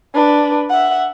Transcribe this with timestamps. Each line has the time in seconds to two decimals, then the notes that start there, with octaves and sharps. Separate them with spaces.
0.14 D4 B4
0.70 E5 F#5